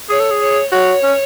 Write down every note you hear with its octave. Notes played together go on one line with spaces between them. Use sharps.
G#4 C#5
A4
G#4
C#5
F#4 C#5
C#4